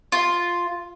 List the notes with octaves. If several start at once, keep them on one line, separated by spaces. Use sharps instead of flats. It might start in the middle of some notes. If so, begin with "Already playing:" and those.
F4